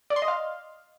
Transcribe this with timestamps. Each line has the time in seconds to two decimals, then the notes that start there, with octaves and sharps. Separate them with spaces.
0.10 D5
0.16 C6
0.22 D#5
0.28 F5